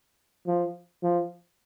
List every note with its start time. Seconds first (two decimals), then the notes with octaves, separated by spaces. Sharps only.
0.47 F3
1.03 F3